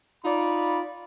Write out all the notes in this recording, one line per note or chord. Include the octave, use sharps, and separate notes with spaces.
D#4 F4 D5 B5